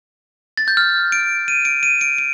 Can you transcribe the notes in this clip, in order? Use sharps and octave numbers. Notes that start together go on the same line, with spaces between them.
A6
G6
F6
D7
D#7
D7
D#7
D7
D7